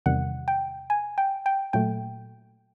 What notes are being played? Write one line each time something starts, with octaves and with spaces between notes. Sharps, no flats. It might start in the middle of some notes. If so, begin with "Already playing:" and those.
E2 C3 D#3 G3 F#5
G5
G#5
G5
G5
A#2 F#3 A3 G5